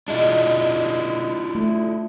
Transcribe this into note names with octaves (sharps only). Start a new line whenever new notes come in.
B2 G#3 D4 E4 F4
A3